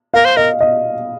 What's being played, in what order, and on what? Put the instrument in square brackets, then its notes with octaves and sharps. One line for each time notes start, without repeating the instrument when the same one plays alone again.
[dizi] A#4 [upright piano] F5
[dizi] C5
[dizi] A#4 [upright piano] D#5
[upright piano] D#5